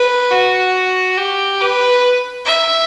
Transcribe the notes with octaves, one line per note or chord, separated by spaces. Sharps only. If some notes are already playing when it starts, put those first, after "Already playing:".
Already playing: B4
F#4
G4
B4
E5